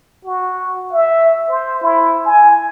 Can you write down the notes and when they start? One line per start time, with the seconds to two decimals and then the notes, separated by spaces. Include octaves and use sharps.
0.25 F#4
0.93 E5
1.49 C5
1.82 E4
2.26 G#5